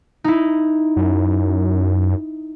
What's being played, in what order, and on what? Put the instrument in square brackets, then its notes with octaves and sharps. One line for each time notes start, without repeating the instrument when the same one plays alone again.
[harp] D#4 E4
[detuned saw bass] F#2